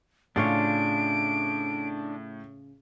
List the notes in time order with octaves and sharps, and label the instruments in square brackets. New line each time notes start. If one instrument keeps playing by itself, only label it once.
[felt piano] A2 [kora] C#3 F4 C#5 [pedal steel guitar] D4 [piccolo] D7